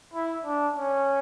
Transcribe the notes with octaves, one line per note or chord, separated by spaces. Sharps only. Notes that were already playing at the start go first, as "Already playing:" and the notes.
E4
D4
C#4